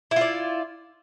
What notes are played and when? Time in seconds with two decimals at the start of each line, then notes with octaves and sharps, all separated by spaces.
0.11 E4
0.16 F4
0.21 D5